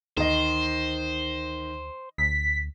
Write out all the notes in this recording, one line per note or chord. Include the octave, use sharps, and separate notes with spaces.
D2 D#3 C5 D#5
D2 B6